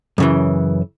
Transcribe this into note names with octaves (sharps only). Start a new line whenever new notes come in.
F#2 C#3 E3